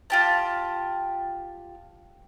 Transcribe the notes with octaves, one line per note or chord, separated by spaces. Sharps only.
F4 G4 A5